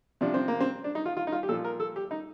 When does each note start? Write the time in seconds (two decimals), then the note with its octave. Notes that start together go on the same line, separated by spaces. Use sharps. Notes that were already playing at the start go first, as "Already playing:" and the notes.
0.21 C3 F3 D4
0.34 C4
0.48 A#3
0.60 C4
0.84 D4
0.95 D#4
1.06 F4
1.17 F4
1.27 D#4
1.32 F4
1.43 G4
1.49 A#2 A4
1.52 F3
1.64 A#4
1.80 A4
1.96 G4
2.11 D#4